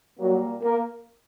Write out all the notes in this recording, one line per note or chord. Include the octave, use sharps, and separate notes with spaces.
A#2 F#3 G3 A#3 F#4
A#3 A#4